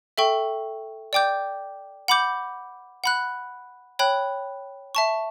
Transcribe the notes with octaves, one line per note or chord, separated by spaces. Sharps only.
A4 E5 G5 C#6
D5 G5 D6 G6
F#5 B5 D6 G6
F#5 B5 F#6
C#5 G5 B5 F#6
E5 A5 C#6